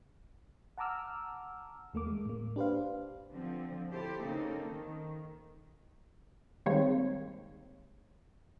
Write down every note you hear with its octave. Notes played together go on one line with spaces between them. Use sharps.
F#5 A5 A#5 D6 E6 F6
E2 A3 A#3 D6
G#3
A2 A#3
D4 G4 B4 C5 F5
D3 F3 C4
E4 G4 A4 C5
C#3 A#3 C4 D#4 A4
D#3
D#3 G3 G#3 A#3 C4 C#5